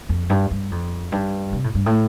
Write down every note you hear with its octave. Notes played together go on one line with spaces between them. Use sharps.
F2
G2
G2
F2
G2
C3
A2
G2
A2